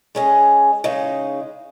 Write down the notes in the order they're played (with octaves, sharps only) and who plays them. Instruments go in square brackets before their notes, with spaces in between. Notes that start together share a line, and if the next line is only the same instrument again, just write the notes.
[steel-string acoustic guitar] G#3 C#4 G#4 D#5
C#3 G#3 D#4